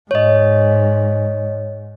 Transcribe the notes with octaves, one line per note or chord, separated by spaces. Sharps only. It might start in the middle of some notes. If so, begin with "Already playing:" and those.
G#2 C#5 D#5